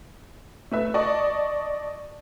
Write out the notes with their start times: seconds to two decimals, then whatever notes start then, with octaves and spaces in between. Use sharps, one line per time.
0.72 A3 B4 E5
0.94 D5 D#5 A5 C#6